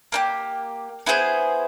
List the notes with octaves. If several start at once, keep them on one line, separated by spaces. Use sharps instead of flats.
A#3 D#4 G4
B3 E4 G#4 C5